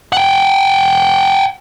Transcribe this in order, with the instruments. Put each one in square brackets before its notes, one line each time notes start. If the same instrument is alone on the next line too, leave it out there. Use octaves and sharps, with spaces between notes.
[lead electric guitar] F#5 G5